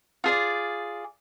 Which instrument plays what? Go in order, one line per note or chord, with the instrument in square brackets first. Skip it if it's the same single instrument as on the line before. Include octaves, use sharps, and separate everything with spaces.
[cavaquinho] F4 G#4 D5